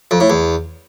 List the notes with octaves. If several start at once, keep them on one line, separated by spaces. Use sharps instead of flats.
F2
A2
E2